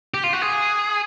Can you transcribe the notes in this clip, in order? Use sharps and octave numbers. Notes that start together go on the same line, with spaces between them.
G4
F4
F#4
G#4